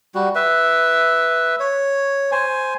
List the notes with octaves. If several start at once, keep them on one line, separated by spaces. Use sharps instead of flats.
G3 F#4
B4 E5
C#5
C5 G#5